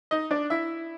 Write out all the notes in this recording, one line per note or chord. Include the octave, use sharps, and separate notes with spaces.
D#4 D#5
D4 D5
E4 E5